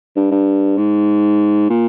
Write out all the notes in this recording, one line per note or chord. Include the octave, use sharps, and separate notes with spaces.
G2
G2
G#2
A#2